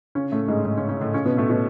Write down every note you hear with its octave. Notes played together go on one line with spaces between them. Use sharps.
C#3 C#4
A2 A3
G#2 G#3
G#2 G#3
C#3 C#4
C#3 C#4
A2 A3
C#3 C#4
B2 B3
A2 A3
B2 B3